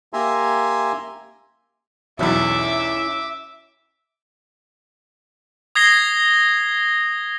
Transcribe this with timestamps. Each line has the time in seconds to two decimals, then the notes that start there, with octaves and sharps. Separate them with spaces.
0.13 A#3 G4 E5 G#5 A#5 C6
2.19 B1 E2 B2 C#4 E4 E5 D6
5.75 D#6 G#6 A#6 C7 G7